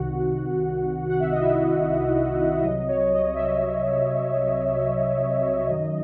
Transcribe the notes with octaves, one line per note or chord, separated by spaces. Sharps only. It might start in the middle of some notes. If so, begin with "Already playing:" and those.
Already playing: C2 C3 D#3 F#4 F#5
F#5
E5
D#5
E4 E5
C2 C3 F#3 D#5
C#5
D#5
E5
D#5
F#2 D#3 F#3